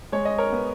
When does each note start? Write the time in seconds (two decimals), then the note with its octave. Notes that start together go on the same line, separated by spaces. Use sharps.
0.12 G#3 C#5
0.25 D#5
0.38 A#4 C#5
0.52 B3